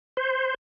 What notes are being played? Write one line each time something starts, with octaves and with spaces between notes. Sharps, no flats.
C5